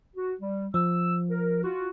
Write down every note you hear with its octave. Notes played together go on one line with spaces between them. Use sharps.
F#4
G3
F3 E6
A#4
F4 F#4